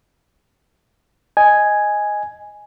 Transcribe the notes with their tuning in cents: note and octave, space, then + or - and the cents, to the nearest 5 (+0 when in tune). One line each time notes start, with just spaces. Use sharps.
D#5 +0 G#5 +0